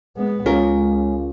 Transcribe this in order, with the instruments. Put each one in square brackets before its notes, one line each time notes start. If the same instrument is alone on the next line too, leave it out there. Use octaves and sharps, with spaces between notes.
[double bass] G#3 B3
[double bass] C#2 [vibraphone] G#3 [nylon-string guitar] C#4 F4 A#4